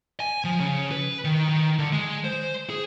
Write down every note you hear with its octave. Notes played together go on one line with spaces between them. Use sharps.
G#5
F3
C#3
B4
D#3
D#3
D3
G#3
C5
G#4